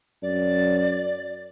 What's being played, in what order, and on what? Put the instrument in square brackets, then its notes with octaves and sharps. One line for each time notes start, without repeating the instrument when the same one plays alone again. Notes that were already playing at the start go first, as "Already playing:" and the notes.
[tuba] F#2 [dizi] D5